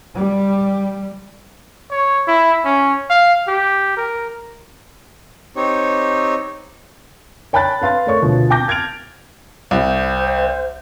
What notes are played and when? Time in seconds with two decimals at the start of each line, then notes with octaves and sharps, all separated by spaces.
0.15 G3
1.91 C#5
2.28 E4
2.65 C#4
3.10 F5
3.48 G4
3.97 A#4
5.56 C4 D#4 G4 C#5
7.53 C#5 G5 A5 B5 F#6 A6
7.82 B4 F5 C6 A6
8.06 A3 A#4 C#5 C#6
8.22 D2 B2 F3
8.50 G5 A5 D6 G6 A#6
8.68 F6 G#6 A6 D7 F7
9.71 C2 C5